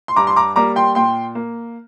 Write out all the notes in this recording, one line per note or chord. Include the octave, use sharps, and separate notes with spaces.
C6
G2 A#5 D6
C6
A#5 D6
G3 A#3 A#5 D6
G5 C6
A#2 G5 C6
A#3